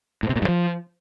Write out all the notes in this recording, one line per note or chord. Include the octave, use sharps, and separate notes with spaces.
A2
C3
A#2
G2
F3